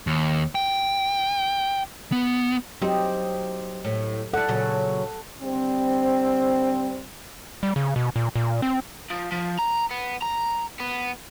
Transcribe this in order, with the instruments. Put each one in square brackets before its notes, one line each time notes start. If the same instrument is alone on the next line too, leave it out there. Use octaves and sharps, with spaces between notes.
[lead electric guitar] D#2
G5
B3
[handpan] F#3 G4 D#5 [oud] C4 D#4
[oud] A2
[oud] E4 D5 [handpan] A4 F#5
[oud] A#2 C#3 F#3
[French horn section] D3 G3 C4
[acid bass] G3
C#3
B2
A#2
A#2
C4
[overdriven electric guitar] F3
F3
A#5
B3
A#5
B3